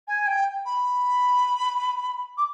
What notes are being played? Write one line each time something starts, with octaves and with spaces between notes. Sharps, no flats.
G#5
G5
B5
D6